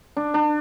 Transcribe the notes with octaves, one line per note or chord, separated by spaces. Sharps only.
D4
D4